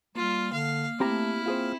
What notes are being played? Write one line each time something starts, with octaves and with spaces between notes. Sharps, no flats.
G3 A#3 F4 F6
D3 F5
A3 C4 E4 G4 A#5
C4 F4 G#4 C5